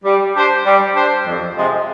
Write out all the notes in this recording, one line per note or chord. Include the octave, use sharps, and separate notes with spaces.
G3
D4 G4 C5
G3
D4 G4 C5
F2
C3 F3 G#3